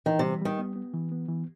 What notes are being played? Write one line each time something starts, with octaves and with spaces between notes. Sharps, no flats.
D#3 E3
C3 G3
D#3 G3
B3
B3
E3
B3
E3